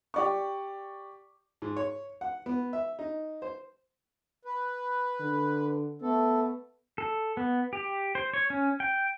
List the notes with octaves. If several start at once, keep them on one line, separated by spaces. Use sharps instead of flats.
G4 D5 C#6
G#2
C#5
F#5
B3
E5
D#4
C5
B4
D3
A3 B3 A4
A4
B3
G4
C5
C#5
C#4
G5